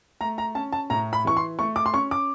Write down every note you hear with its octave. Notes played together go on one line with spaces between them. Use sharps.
A3 A#5
A#5
C#4 A5
A5
A2 A#5
B5
E3 C#6
C6
A3 C#6
D6
C6
C#4 C#6
D6